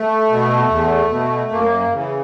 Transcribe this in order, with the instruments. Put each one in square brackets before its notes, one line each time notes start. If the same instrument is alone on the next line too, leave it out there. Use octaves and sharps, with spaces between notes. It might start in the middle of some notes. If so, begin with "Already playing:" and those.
Already playing: [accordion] A3
B2
E2
B2
F#2 A#3
C#3 E3